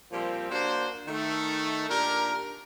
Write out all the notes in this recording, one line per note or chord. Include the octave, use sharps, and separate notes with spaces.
A#2 F3 G3 C4
A#3 D4 F#4 C5
D#3 A3
A#2 D4 G4 A#4